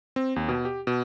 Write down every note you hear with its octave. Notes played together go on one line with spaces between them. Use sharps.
C4
D#2
B2
G4
B2